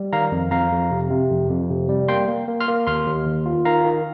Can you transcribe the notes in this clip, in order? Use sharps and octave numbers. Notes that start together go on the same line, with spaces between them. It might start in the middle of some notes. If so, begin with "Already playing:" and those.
Already playing: G3
D#3 F5 A#5
F2
F2 F5 A#5
F2
C3
C3
F2
F2
C3
G3
A#3 G5 C6
A#3
A#3
C6 F6
A#3
D#2 C6 F6
D#2
D#3
F4
D#3 F5 A#5
D#3